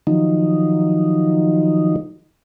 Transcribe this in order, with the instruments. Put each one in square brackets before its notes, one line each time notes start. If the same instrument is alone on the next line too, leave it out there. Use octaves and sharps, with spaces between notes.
[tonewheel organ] D#3 F3 F#3 D#4